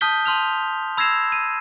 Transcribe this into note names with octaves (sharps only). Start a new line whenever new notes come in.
A5 D#6 F6 G6 B6 G7
A5 C6 F6 F7
B5 E6 G#6 A#6 C7 E7
D#7